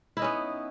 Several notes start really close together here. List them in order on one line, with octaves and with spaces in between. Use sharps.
E4 D#4 C#4 B3